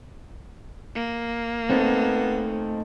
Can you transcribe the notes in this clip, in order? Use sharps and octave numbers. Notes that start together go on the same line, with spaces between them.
A#3
A3 B3 C4 D#4 A4